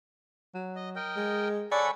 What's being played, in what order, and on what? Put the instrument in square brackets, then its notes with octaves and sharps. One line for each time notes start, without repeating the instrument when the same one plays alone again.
[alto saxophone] F#3
[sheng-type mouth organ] D#5
A#4 D#5 G5
[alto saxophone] G#3
[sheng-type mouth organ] A4 F#5 [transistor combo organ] C#5 G#5 B5 [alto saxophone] D5